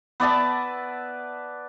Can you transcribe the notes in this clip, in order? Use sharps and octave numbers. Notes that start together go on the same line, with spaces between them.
B3 D5 E5 A5